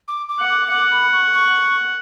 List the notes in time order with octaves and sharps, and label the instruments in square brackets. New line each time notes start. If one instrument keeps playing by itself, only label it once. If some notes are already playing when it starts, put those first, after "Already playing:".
[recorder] D6
D6
[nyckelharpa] F#5
[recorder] D6
[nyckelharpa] F#5 [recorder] D6
[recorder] B5
C#6
C#6